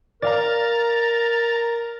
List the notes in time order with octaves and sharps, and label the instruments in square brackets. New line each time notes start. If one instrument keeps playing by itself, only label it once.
[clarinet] A#4 [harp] D5 F5 [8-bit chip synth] A#5 A6